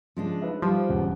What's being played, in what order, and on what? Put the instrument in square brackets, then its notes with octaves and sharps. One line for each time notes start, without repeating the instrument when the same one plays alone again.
[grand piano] C#3 [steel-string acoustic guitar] F3 G#3 D4
[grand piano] D#4 B4 E5
[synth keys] F3 [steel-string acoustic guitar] G3
[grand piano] E1 C#3 F#5